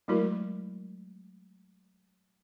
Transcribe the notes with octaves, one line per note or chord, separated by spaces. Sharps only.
F#3 G#3 A3 E4 F#4 A#4